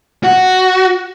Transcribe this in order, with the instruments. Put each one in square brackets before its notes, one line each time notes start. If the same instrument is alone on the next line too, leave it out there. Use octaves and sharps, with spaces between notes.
[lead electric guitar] F#4